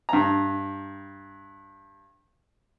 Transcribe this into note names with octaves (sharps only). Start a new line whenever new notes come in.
G2 A#5